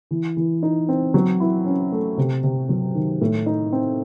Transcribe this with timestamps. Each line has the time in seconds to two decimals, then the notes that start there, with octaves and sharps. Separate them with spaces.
0.11 E3
0.37 E3
0.63 D#4
0.89 C4
1.14 F#3
1.40 E4
1.66 C#4
1.92 A3
2.18 C3
2.43 C3
2.69 F#3
2.95 D#3
3.21 A2
3.46 D#4
3.72 C4